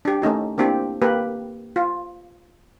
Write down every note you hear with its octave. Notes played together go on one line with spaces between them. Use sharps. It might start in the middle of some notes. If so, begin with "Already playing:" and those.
D4 G4
A3 C#4 D#4 G4
A#3 C4 D4 E4 G4
A#3 G4 B4
F4